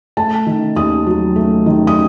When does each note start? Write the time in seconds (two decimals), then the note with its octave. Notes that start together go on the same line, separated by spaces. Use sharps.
0.17 A3 A5
0.46 D#3
0.76 D#2 D#6
1.06 F#3
1.36 A3
1.66 D#3
1.87 D#6